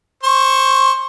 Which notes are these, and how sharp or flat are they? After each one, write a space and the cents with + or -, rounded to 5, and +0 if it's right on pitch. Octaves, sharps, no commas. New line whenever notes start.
C5 +15 C#6 +0